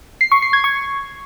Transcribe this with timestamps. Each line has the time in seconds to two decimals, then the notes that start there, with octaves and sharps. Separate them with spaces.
0.21 C7
0.32 C#6
0.42 C7
0.53 G#6
0.64 C#6